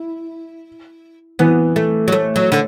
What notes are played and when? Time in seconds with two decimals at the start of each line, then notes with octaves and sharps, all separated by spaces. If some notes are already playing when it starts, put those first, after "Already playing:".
Already playing: E4
1.39 E3 B3
1.76 A3
2.08 F#3
2.12 A3
2.36 F#3
2.52 D3